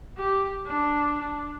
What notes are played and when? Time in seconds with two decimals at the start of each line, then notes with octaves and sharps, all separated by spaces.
0.17 G4
0.66 D4
1.20 D4